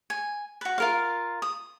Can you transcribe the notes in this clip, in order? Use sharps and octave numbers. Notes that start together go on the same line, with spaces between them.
G#5
F#4 B4
F4 A#4 F5
D#6